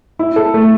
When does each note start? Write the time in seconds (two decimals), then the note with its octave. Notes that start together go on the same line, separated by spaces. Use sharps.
0.19 E4
0.36 A4
0.54 A3